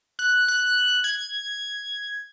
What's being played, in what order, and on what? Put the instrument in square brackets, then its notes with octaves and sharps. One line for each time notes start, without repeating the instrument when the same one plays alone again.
[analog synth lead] F#6
F#6
G#6